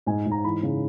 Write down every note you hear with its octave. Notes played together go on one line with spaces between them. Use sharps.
G#2 G#5
G#2
A#5
E3 B5
C#3